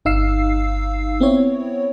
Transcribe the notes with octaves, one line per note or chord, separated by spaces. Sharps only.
G1 D#4 F5 E6 C7
B3 C4 E4 C#5